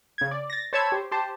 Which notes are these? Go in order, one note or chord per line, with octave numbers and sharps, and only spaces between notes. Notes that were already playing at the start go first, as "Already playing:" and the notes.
C#3 G#6
D5
A6 A#6
C5 C#5 A5 B5 E6 G#6
G4 C5
G4 C5 A5